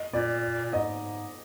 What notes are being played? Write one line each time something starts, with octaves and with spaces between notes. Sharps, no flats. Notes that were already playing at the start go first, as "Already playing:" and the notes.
Already playing: D#5
A#2 D5
A#2
G#2 D#5